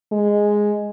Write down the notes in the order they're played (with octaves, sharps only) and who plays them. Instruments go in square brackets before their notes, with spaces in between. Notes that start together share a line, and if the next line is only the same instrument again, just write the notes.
[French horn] G#3